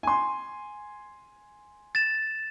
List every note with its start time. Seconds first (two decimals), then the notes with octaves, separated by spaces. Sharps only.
0.03 G#5 C6
1.95 A6 E7